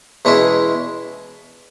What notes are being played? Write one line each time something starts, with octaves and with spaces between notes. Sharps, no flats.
E2 B2 G#3 C#4 E4